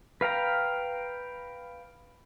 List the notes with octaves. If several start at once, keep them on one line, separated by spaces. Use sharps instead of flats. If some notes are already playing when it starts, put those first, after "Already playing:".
B4 F5 G5 A#5